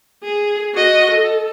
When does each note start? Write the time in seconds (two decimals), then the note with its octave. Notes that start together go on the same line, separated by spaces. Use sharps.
0.23 G#4
0.74 F#4 D#5
1.12 A4